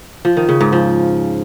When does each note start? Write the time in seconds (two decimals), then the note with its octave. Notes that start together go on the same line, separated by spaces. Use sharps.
0.25 F3
0.37 D#3
0.49 C#3
0.61 G#2
0.72 F3